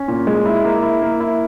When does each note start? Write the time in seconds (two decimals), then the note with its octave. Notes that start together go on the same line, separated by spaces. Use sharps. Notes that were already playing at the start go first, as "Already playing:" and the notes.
Already playing: C#4
0.08 A#2
0.27 G#3
0.46 E4
0.65 A#3
0.83 E4
1.02 A#3
1.20 E4